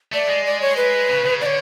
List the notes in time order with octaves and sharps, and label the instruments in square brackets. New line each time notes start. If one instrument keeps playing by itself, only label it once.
[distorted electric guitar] A3 [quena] D5
[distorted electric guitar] G#3
[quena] D5
C#5
B4
[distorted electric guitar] C#3
C#3
[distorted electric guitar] D3 [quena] C#5 D5